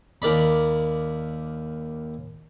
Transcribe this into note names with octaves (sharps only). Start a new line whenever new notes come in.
D#2 A#4 D5 B5